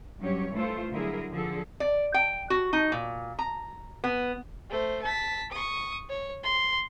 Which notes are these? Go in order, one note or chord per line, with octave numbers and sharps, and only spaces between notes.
G2 F#3 C#4 G4 C#5
E3 A3 F4 A4 C5
D3 F#3 G3 E4 G#4 A#4
D3 F3 G#4 A4
D5
G5
F#4
D#4
A#2
A#5
B3
A3 C5
A5 B6
C#6 D#6
C#5
C6